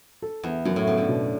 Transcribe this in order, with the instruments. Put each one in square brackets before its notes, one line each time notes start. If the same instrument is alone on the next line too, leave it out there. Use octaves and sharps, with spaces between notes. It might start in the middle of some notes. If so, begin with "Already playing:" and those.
[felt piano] A4
[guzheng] E2 [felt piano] B3
[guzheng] F#2 [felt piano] F#3
[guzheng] A2
[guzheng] C#3 [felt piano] B3
[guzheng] D3
[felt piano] B2